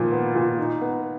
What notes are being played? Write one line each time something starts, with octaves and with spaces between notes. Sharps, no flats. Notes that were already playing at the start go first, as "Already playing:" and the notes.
Already playing: A#2 D#3 F3
B3
A#2
D#4
B3